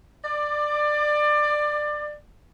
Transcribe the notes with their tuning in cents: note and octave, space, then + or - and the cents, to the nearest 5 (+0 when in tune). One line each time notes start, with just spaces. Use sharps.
D5 +20